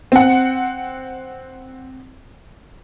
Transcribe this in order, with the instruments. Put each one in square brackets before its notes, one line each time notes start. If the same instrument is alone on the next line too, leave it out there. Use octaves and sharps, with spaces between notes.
[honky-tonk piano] C4 F#5